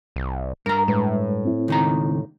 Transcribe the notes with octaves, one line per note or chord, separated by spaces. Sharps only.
C2
G2 A#4 A#5
A2 G#3 B4
C4 E4
C#2 D#3 A#5